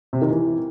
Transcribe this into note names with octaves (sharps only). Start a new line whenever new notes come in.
C3
D#3
E3